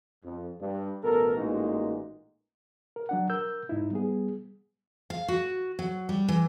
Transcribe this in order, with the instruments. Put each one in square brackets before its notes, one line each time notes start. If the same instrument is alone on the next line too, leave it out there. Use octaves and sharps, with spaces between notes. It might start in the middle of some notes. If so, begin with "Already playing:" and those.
[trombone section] F2
G2
A1 B2 A4 A#4
A1 A#2 E3 G#3 D#4 F#4
[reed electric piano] A#4
F#3 D4 F#5
A#4 E6 G6
G#2 D#4 E4
G3 B3 G#4
[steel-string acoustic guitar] F5
F#4
F#3
G3
E3